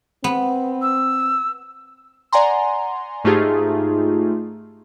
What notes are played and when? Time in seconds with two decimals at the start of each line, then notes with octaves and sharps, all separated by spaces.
0.24 B3 C4
0.82 E6
2.33 D5 F#5 G#5 A#5 C6
3.24 G#2 A3 D#4 F4 G4 G#4